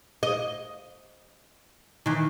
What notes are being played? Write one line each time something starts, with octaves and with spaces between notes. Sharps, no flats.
D#5
D#3 E3